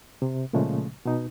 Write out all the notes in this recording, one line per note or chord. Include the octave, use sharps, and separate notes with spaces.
C3
A#2 C#3 F3 G#3 A3 C#4
B2 D#4